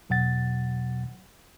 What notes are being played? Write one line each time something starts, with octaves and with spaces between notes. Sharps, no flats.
E2 B2 F#3 F#5 A6